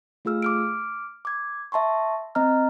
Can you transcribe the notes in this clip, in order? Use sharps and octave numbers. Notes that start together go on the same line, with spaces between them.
A3 F4 G#4 E6 F6
D6 F6 D7
D6 G#6
E5 A5 C6 C#6
C4 D#5 A#5 F6